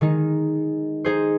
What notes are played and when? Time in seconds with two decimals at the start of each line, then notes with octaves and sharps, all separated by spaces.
0.01 D#3 G#3 D#4
1.05 D#4 G#4 C5